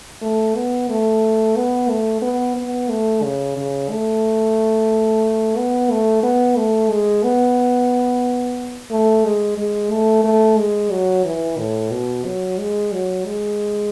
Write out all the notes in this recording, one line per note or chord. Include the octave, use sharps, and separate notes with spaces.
A3
B3
A3
B3
A3
B3
B3
A3
C#3
C#3
A3
B3
A3
B3
A3
G#3
B3
A3
G#3
G#3
A3
A3
G#3
F#3
E3
A2
B2
F#3
G#3
F#3
G#3